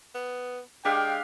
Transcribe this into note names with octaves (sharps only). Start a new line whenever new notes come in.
B3
G#3 D4 G4 F5 G5